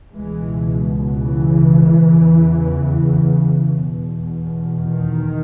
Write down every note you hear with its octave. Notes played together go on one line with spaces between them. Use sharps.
C#2 B2 E3 G#3
C#3 E3
E2 C#3
E2 B2
D#3